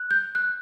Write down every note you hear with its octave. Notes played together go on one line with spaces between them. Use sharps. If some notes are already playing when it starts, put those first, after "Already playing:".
Already playing: F#6
G6
F#6